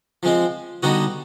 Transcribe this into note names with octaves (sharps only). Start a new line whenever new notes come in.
F3 G#3 C4
D3 G3 B3 D#4 F#4